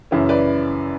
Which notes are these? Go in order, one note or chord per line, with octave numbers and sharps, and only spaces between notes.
F#2 C#3 E3 C#4 E4
B4 D5